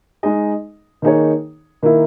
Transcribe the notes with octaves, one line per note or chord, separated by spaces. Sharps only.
G#3 D#4 G#4 D#5
D#3 A#3 D#4 G#4 C#5
D#3 A#3 E4